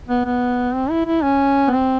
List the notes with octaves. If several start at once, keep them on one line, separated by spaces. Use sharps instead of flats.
B3
B3
C4
E4
E4
C#4
B3
C4